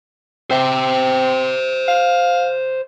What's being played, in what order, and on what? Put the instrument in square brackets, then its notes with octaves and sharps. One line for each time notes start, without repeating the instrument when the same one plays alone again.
[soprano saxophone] C4 [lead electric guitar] C5 E5
[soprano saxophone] F5